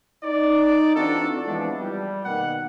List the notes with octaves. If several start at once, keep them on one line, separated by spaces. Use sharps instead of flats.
D#4 D5
E3 C4 D4 F4 F#4 A4
E3 F3 G#3 B3 D4
G3
B2 D#3 A#3 B3 F#5